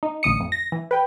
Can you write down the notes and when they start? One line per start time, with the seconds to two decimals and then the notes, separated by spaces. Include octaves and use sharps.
0.03 D#4
0.23 A1 D2 D#6 C#7
0.40 F2
0.52 A#6
0.72 E3
0.91 B4 G5